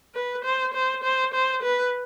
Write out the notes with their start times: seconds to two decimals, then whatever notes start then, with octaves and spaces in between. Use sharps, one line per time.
0.15 B4
0.44 C5
0.74 C5
1.03 C5
1.34 C5
1.63 B4